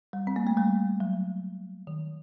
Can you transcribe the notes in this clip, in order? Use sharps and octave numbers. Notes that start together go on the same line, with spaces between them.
G3
C4
A#3
A3
G3
F#3
D#3